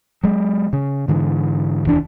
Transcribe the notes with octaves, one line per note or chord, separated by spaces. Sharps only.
F#3 G#3
C#3
G#2 D3 E3
F1 D#2 E3 D4